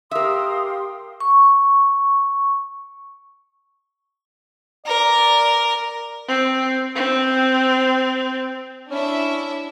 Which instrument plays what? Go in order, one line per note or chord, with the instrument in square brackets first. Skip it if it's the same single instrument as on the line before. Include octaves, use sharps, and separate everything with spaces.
[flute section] G4 F5 C6 [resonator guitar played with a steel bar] A#4 E5 [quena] D#6
[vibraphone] C#6
[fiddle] A#4 [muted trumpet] D5
[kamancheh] C4
C4
[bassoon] C#4 [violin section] D4 E4 E5